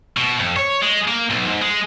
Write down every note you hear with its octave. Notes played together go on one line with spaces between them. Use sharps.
B2
F2
C#5
G#3
A#3
B1
G#2
G#3